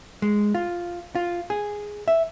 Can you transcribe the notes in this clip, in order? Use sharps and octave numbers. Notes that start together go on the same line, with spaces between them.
G#3
F4
F4
G#4
E5